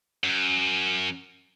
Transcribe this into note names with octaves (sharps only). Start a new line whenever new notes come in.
F#2